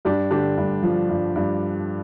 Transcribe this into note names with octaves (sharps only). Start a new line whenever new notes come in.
G2 D4 G4
D3 D4 G4
G2
F3
G2
G2